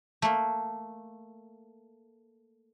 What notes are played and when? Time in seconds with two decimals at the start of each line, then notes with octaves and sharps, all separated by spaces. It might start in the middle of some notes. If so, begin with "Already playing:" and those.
0.22 A3 A#3